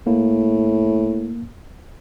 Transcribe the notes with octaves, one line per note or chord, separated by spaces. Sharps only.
A2 A#3